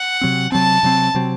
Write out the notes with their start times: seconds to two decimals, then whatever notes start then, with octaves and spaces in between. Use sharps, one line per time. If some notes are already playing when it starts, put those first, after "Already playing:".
Already playing: F#5
0.21 C3 F#3 C4
0.52 C3 F#3 C4 A5
0.83 C3 F#3 C4
1.14 C3 F#3 C4